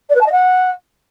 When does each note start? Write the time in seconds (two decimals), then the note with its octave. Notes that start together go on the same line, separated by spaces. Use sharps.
0.10 D5
0.15 B4
0.21 A5
0.26 D#5
0.32 F#5